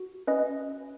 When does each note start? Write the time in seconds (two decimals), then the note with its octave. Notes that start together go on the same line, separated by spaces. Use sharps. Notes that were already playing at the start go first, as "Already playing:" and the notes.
Already playing: F#4
0.27 C#4 B4 D#5